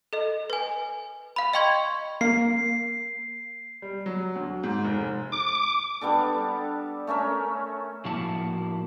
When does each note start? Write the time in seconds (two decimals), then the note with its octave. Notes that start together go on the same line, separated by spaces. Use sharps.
0.13 A4 D#5
0.50 B4 G#5
1.36 F5 B5
1.54 D#5 G5 C6 C#6 G#6
2.21 A#3 C7
3.82 G3
4.06 F#3
4.35 D2
4.63 G#2
4.85 F1
5.32 D6
6.01 G3 B3 D4 A4
7.07 A3 C#4 A#4 E5
8.05 A2 F3 A#3 E4 F#4 A5